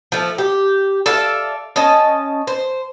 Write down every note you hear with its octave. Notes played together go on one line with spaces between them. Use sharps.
F3 A3
G4
A4 D5 E5 F5
C#4 D#5 A5
C5